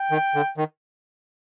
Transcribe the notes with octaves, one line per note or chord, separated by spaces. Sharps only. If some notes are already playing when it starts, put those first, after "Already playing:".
Already playing: G5
D#3
D3
D#3